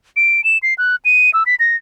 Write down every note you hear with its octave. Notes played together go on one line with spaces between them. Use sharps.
D7
E7
C7
F#6
D#7
E6
B6
A#6